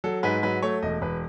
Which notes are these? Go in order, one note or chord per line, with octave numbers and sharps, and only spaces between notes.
F#3 A4
G#2 B4
F#3 B4
A3 C#5
E1 D#5
E1 B4